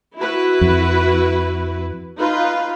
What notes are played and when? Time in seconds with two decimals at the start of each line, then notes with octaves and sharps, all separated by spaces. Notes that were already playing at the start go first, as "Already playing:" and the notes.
0.16 E4 F#4 B4
0.61 F2
2.17 D#4 F4 B4